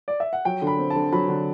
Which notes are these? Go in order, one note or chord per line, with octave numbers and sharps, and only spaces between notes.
D5
E5
F#5
F#3 G5
D3
B5
C4
D3 A5
F#3 B5
D3